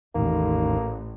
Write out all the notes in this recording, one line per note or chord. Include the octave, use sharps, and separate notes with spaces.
A1 E2 D#3 A#3